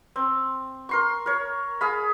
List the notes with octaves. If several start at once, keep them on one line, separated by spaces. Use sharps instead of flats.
C4
A#4 C6 C#6
A#4 C#5
G#4 F5 B5